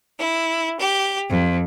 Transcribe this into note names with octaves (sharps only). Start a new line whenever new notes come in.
E4
G4
F2